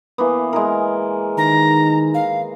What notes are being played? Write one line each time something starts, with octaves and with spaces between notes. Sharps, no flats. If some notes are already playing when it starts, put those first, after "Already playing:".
E3 A#3 B3
G#3 E4 A#4
D#3 A#5
F5